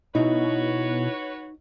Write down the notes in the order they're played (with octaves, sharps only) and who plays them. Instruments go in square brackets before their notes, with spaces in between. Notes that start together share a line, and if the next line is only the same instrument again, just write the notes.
[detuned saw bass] B2 [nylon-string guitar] D#4 [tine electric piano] E4 [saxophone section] F#4 B4 C#5